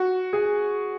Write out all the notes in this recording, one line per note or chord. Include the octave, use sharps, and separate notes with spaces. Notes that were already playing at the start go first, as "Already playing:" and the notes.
Already playing: F#4
G#4